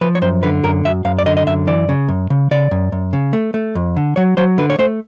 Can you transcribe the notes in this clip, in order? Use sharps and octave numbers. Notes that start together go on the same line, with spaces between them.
F3 B4
C#5
F#2 C5
D3 B4
F#2 A#4
F#2 E5
F#2 F5
D5
D3 D#5
D#5
F#2 E5
E3 D5
C#3
F#2
C#3
C#3 D5
F#2
F#2
C#3
A3
A3
F2
D3
F#3 C#5
F#3 C5
D3 B4
C#5
A3 C5